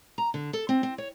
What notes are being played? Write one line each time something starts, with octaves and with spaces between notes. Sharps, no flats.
A#5
D3
A4
C4
C4
C#5